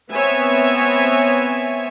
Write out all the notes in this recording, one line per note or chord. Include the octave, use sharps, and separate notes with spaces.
B3 C4 C#5 E5 G#5